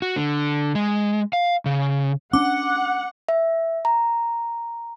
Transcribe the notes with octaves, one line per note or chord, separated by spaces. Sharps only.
F#4
D3
G#3
F5
C#3
C#4 D4 F#5 D6
E5
A#5